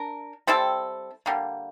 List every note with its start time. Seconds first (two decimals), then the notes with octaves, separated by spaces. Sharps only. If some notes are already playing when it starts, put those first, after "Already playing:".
Already playing: D4 A#4
0.47 G3 C4 E4 A4
1.26 D3 G3 A#3